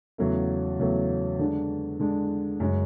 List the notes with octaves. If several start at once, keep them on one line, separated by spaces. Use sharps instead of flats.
E2 C#3 F#3 A3
E2 C#3 F#3 A3
D3 G#3 D4
D3 G#3 D4
F#2 C#3 G#3